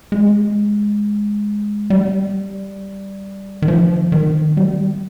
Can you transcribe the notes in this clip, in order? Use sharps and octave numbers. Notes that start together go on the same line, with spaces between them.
G#3
G3
D#3
F3
D#3
G3